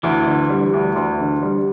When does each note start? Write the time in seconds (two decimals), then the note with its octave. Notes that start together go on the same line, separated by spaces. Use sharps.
0.03 D2 E3
0.27 D3
0.50 G3
0.74 D2
0.96 D2
1.20 D3
1.43 G3